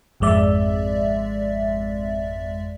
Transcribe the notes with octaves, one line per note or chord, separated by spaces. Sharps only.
G#1 F2 G#3 D5 E5